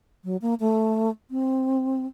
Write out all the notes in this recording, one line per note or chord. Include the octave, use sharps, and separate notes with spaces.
F#3
A#3
A3
C4